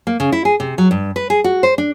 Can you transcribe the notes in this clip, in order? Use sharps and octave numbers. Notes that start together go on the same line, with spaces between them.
A#3
C#3
E4
G#4
C3
F#3
G2
B4
G#4
F#4
C5
D4